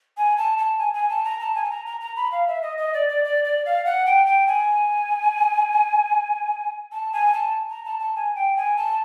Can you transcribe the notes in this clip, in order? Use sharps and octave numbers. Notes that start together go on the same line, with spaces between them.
G#5
A5
A5
G#5
G#5
A5
A#5
A5
G#5
A5
A#5
A#5
A#5
B5
F5
E5
D#5
D#5
D5
D5
D5
D5
F5
F#5
G5
G5
G#5
A5
G#5
A5
A#5
A5
A5
G#5
G5
G#5
A5